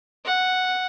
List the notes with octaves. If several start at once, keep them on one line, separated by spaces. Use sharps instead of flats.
F#5